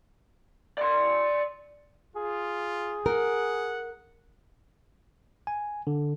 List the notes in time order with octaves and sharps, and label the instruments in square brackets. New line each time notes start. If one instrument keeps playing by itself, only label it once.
[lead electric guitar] D5 C6
[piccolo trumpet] F4 [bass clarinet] G#4
[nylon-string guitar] A#4 [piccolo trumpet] F#5
[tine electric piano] G#5
D3